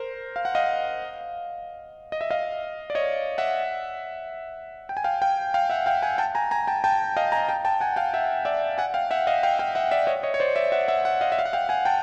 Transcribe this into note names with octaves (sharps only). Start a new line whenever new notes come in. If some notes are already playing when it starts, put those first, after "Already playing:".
Already playing: A#4 C5
F5
F#5
D#5 F5
D#5
E5
D#5 F5
D5
C#5 D#5
E5 F#5
G5
G#5
F5 G5
F5 G5
F5 G5
E5 F#5
F5 G5
F#5 G#5
G5 A5
G#5 A#5
G#5 A#5
G5 A5
G5 A5
D#5 F5
G#5 A#5
G5 A5
G5 A5
F#5 G#5
F5 G5
E5 F#5
D5 E5
F#5 G#5
F5 G5
E5 F#5
D#5 F5
F5 G5
F5 G5
E5 F#5
D5 E5
C#5 D#5
C#5 D#5
C#5
C5 D5
D5 E5
E5 F#5
E5 F#5
E5 F#5
D#5 F5
E5
F5
F#5
F5 G5
F#5 G#5
G5 A5